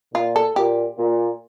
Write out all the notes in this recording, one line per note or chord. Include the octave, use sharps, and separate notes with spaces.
A#2 F4
A4
A#2 G4
A#2